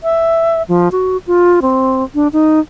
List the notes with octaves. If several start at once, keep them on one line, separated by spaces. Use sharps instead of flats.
E5
F3
F#4
F4
C4
D4
D#4